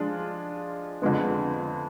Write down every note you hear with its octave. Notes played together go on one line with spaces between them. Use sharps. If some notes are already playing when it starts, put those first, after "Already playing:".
Already playing: F3 G#3 D4 F4 G#4
F2 D3 G#3 B3